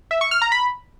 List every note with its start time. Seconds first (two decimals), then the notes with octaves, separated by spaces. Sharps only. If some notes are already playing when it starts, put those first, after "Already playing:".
0.11 E5
0.21 C#6
0.31 F6
0.42 A#5
0.52 B5